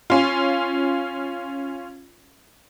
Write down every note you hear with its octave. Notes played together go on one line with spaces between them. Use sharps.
C#4 F4